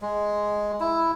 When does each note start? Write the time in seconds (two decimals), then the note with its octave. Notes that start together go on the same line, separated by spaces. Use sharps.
0.02 G#3
0.80 E4